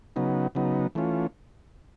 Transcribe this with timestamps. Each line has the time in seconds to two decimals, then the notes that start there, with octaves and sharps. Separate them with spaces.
0.16 C#3 F#3 B3 D#4
0.55 C#3 F#3 B3 D#4
0.95 E3 A3 C#4 F4